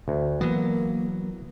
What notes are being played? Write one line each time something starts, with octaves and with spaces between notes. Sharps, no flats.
D2
E3 F#3 A#3 B3